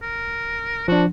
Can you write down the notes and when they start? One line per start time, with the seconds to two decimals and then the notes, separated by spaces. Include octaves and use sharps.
0.02 A#4
0.88 F3 D4 F#4